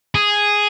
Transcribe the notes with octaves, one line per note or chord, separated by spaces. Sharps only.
G#4